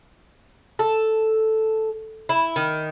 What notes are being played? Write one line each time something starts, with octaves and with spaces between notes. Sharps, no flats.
A4
E4
D#3